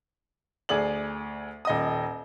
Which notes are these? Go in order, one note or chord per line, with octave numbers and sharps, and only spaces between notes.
D2 G#4 D5 F#7
D#1 D#5 D#6